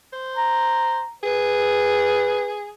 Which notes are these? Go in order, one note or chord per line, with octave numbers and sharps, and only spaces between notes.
C5
A#5
G#4 B4